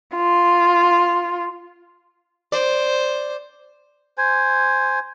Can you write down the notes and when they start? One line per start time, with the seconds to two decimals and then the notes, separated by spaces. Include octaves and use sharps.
0.17 F4
2.52 C5 D5
4.18 C5 G#5